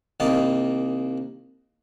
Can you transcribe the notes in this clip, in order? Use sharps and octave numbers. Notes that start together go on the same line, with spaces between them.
C2 D#3 A#3 D#5 A5